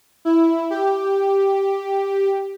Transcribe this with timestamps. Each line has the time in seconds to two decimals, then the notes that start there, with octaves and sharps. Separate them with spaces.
0.25 E4
0.70 G4